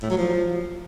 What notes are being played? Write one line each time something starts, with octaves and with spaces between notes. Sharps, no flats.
A2
F#3
F3